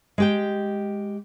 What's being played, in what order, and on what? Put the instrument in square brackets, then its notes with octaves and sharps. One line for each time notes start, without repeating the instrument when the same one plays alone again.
[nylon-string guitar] G#3 G4 G5